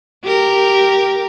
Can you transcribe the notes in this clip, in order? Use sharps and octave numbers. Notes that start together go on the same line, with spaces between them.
G4 A#4